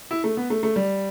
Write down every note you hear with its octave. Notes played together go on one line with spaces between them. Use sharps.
E4
A3
B3
A3
A3
G3